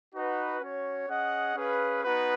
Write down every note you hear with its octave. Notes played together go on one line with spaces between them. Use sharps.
D#4 F#4 B4 F#5
C#4 F#4 C#5
C#4 G#4 D#5 F#5
C#4 G#4 B4 F5
B3 D#4 F#4 B4